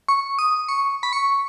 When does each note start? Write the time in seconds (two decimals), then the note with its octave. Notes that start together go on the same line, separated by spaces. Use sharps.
0.08 C#6
0.39 D#6
0.68 C#6
1.03 B5
1.13 C#6